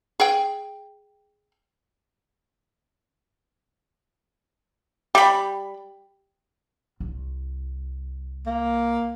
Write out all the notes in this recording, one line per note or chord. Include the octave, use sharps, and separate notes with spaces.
G#4 G5
G3 G4 B5
C2
A#3